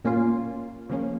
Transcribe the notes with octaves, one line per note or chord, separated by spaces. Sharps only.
A#2 A#3 C#4 F4
C#3 F3 A#3 C#4